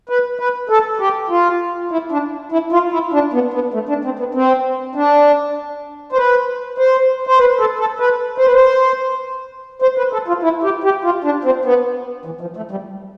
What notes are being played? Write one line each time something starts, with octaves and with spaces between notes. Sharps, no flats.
B4
B4
A4
G4
F4
E4
D4
E4
F4
E4
D4
B3
B3
A3
D4
C4
B3
C4
D4
C5
B4
C5
C5
B4
A4
A4
B4
C5
B4
C5
C5
B4
A4
F4
E4
G4
G4
F4
D4
C4
B3
E3
F3
A3
G3